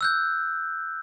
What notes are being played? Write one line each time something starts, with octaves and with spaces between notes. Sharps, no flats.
E6 F#6 G6